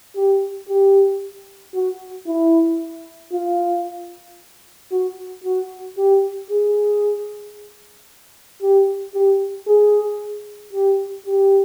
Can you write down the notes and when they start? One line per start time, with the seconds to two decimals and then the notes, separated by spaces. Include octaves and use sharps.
0.16 G4
0.68 G4
1.74 F#4
2.27 E4
3.33 F4
4.91 F#4
5.44 F#4
5.97 G4
6.50 G#4
8.62 G4
9.14 G4
9.67 G#4
10.73 G4
11.26 G4